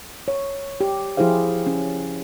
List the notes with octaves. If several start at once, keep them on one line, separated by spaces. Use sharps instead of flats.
C#5
G4
F3 E4 G4 G#4 C5 F5
C#4